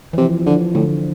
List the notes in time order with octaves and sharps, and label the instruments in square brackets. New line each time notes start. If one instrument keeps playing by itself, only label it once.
[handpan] E3
[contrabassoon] C3 [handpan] F3
[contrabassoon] D3 [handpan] F3
[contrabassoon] A2 [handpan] D3